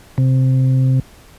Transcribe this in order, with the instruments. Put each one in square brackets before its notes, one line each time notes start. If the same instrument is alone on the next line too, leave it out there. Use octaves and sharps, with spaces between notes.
[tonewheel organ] C3